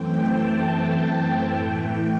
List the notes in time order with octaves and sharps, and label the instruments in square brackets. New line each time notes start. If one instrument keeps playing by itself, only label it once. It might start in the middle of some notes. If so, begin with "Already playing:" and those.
Already playing: [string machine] F#2 E3 A3 C4 G5
A5
A5
G5
A2 E3 A3